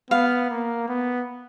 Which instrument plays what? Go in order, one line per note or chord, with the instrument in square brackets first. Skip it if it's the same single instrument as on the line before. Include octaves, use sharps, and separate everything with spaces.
[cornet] B3 [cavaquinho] F5
[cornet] A#3
B3